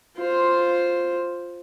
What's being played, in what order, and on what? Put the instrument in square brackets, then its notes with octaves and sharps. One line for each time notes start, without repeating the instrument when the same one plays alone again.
[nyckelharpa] F4 C5